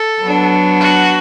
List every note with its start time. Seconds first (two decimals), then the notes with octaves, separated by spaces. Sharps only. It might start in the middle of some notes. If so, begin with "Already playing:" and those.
Already playing: A4
0.22 F#3 B3 D4
0.80 F#4